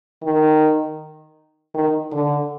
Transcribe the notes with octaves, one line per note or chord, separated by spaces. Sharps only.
D#3
D#3
D3